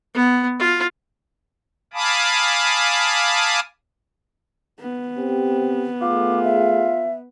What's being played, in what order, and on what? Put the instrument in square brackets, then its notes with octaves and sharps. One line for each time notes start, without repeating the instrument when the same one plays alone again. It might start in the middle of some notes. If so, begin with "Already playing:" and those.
[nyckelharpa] B3
F4
[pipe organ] F5 G#5 A5 B5 D6 D#6
[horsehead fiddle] B3
[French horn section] C4 G4
[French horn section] A3 G#4 [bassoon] F4 [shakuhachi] D6
[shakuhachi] E5